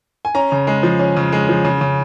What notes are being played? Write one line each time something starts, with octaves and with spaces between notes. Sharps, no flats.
G#5
C#4 A#5
C#3
G#3
F3
C#4
C#3
G#3
F3
C#3
C#3